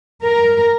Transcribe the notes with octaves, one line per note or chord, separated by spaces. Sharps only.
A#4